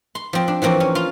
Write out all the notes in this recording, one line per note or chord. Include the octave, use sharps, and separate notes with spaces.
C6
F3 C4
D4
E3 F3 A#3 C4 C#4
C#4
F4 F5